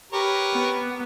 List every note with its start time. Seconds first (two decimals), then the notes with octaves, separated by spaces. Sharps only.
0.13 G4 A#4 B4 C#5
0.54 B3